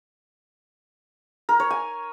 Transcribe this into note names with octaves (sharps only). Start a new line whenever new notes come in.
A#4
C#5
G#5